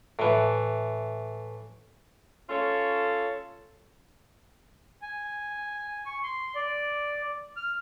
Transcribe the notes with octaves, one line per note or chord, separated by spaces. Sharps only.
A2 E3
C#4 F4 A4 C#5
G#5
C#6
C6
D5
F6